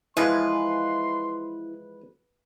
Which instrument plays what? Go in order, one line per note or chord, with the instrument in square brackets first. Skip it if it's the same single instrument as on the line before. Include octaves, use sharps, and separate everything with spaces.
[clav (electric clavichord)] E3 F3 G#3 [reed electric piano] E4 [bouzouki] B4 [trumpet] C6